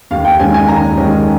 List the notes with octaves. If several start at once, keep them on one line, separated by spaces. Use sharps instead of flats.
D#2 F5
G5
D#3 G#3 C#4 G#5
G#5
D#2 A#5
D#3 G#3 C#4